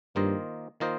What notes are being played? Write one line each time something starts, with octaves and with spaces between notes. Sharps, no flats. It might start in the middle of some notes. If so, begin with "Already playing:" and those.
G2 D#3 A#3 F4 C5 D#5
D#3 A#3 F4 C5 D#5